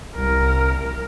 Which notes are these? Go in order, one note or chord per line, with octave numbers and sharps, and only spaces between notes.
C2 A#4